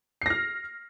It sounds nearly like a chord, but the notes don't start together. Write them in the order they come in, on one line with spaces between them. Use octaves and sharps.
C7 A#6 F6